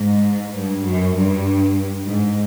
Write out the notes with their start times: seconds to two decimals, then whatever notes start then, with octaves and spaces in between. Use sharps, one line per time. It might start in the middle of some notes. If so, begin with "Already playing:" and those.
Already playing: G#2
0.54 G2
0.84 F#2
1.15 G2
2.05 G#2